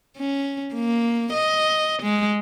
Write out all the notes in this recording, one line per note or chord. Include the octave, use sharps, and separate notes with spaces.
C#4
A#3
D#5
G#3